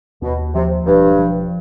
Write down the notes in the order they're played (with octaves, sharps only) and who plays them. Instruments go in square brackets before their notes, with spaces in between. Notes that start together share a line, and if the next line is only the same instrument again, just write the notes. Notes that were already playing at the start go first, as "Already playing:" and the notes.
[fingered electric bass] D#2 [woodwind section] B2
[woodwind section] C3 [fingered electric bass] F3
[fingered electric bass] E1 [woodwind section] G2
[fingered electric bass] F3